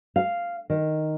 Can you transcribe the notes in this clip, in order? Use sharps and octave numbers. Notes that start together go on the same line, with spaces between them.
F5
D#3